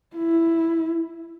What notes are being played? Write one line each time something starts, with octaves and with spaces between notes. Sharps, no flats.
E4